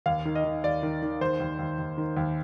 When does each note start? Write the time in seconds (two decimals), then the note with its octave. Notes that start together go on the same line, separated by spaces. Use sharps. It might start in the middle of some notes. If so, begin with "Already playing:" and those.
0.06 D#2 F5
0.25 D#3
0.35 D#5
0.44 D#3
0.64 D#2 D5
0.83 D#3
1.02 D#3
1.21 D#2 C5
1.40 D#2
1.59 D#2
1.79 D#2
1.98 D#3
2.17 D#2